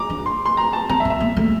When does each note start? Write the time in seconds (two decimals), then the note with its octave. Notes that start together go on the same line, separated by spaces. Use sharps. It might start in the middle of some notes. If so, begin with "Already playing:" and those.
Already playing: A#5 D6
0.10 D4
0.26 C6
0.46 C6
0.57 A#5
0.73 A5
0.89 C4 A#5
1.00 E5
1.05 C4
1.10 E5
1.20 A#3
1.37 A3